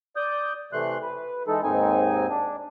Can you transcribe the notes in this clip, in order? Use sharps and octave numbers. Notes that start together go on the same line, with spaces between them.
D5 D#6 G6
C3 E3 A3 C6 F#6
B4
E3 G#3 D#4 A4
D#2 G#2 C4 D#4 G#5
D4